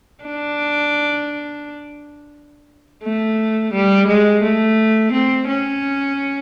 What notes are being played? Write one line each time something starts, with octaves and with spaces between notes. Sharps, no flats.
D4
A3
G3
G#3
A3
C4
C#4